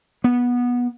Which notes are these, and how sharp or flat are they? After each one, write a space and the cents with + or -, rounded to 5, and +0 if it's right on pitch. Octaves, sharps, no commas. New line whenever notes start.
B3 -15